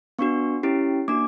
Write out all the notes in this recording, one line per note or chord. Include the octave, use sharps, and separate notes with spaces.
B3 D4 F#4 C#6
C#4 E4 G4
A#3 D4 F#4 D6